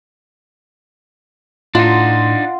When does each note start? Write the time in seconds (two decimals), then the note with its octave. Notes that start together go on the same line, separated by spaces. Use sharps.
1.75 A2 D4 D#4 F4 F#5